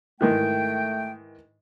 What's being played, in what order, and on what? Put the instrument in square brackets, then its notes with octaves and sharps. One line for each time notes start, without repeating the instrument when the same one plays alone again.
[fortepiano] G#2 D#3 E3 [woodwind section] A3 G5